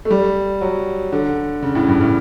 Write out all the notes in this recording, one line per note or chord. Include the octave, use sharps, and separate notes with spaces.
A3
G3
F#3
D3
C#3
A2
G2
A2